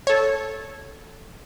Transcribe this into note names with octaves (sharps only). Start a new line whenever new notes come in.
A4 C#5